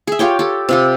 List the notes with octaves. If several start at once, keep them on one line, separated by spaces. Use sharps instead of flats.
G#4 E5
F4 G4 C#5 G5
G4 A4
C3 F4 G4